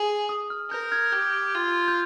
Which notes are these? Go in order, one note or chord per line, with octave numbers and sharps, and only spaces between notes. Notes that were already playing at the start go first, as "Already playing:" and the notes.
Already playing: G#4
D#6
F6
A#4 G6
F6 G#6
G4 G6
F4
G6